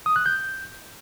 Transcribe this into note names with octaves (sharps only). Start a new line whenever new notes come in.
D#6
F#6
G6